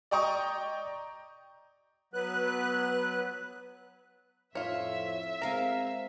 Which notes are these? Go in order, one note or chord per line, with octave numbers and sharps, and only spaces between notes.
D5 D#5 G5 A#5 C#6 D#6
F#3 B3 B4 F#6
F2 A2 F4 C#5 E5
G#3 C4 A#4 F5 G#5 A#5